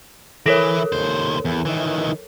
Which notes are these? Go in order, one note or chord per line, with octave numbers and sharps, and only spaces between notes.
E3 E4 A4 A#4 C#5
D#2 C5
E2
D#3 E3